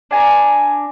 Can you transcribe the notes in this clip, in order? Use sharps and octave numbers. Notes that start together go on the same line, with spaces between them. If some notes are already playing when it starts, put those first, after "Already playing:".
D4 G#5 A#5